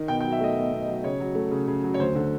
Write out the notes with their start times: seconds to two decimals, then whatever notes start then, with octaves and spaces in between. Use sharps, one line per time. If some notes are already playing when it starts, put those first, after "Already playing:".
Already playing: D#3
0.08 B2 G5
0.20 G5
0.24 F#3
0.32 E5
0.40 A3 D#5
0.56 B2
0.72 B2
0.88 F#3
1.04 C#3 C#5
1.20 F#3
1.35 A3
1.51 C#3
1.68 C#3
1.83 F#3
1.94 C#5
1.99 D2 C5
2.15 D3